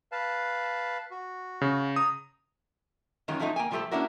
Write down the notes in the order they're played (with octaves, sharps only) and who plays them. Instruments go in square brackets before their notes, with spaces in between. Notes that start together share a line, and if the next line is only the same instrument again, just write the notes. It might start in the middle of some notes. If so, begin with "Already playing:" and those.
[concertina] B4 F5 A5
F#4
[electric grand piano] C#3
[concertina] A#5 [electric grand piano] D#6
[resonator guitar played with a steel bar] F#2 D#3 G#3 C#4 F4
F3 F#3 A3 C4 D#4
A#3 G5 G#5
A#2 F3 G3 A3 G4 A4
A#3 C#4 D4 E4 F#4 A#4